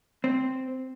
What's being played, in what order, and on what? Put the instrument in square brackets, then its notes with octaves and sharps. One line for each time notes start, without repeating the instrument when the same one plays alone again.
[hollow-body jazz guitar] C4